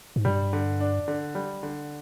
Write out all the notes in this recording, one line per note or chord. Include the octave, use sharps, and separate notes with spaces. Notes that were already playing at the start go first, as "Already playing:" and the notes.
G#2
G2 G3
D3
D4
D3
G3
D3